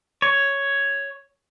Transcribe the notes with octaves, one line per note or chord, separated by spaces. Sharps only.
C#5